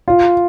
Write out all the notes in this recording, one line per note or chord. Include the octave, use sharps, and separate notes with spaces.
F4